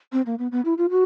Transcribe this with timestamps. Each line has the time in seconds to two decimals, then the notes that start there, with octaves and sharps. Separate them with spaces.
0.13 C4
0.26 A#3
0.39 B3
0.52 B3
0.65 E4
0.78 F4
0.90 F#4